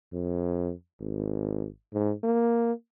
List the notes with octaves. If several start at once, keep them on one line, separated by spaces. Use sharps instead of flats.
F2
G#1
G#2
A#3